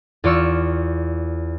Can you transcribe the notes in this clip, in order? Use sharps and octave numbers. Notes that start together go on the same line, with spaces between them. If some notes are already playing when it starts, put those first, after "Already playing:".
E2 F4 D5 F5 C#6 E6